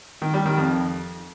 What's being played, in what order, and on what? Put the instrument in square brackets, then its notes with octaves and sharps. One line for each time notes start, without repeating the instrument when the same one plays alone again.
[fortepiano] D#3
G3
D#3
F2